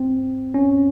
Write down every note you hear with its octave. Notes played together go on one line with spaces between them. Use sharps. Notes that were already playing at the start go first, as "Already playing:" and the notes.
Already playing: C4
C#4